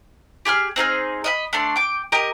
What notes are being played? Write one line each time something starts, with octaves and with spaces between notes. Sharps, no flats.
G4 G#4 C6 F6
C4 D#4 G#4 F6
D#5 E5 B5
A3 D4 C6
G5 D6
G4 A#4 D#5